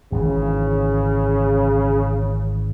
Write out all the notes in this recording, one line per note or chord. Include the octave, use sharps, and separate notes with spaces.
G#1 C#3 E3